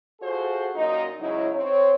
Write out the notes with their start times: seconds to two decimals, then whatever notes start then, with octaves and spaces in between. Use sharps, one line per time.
0.21 F4 F#4 G#4 A4 C5
0.75 F#2 A#2 D#4
1.20 G#2 C#3 F#3 D#4 E4
1.54 C4 C#5